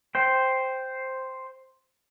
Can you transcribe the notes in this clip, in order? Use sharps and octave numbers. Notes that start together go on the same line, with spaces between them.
C5 G5